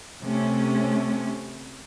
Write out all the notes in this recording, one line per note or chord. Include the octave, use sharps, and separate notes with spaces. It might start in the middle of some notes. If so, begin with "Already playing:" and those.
C3 A3 C#4